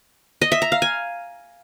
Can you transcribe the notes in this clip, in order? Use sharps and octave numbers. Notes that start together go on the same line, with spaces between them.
D#5
E5
A#5
F5
G#5